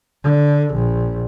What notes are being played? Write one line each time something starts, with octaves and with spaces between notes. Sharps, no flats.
D3
A#1